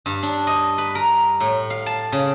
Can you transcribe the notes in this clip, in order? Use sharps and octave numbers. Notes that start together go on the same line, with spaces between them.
G2
D4
D#5
B4
A#4
A2
F5
A5
C#3